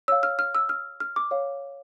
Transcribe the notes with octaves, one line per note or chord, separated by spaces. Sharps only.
C#5 F5 E6
F6
F6
E6
F6
F6
D6
C#5 F5